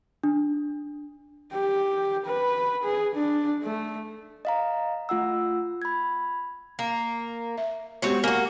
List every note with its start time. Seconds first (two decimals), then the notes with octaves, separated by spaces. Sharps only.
0.23 D4
1.53 G4
2.26 B4
2.84 G#4
3.15 D4
3.63 A3
4.45 D#5 F5 A#5
5.09 A3 F4 F#5 E6
5.82 B5 G#6
6.79 A#3
7.58 E5
8.02 G#3 B3 C4 F#4 G4 C#5
8.24 A#3 F#4 G#5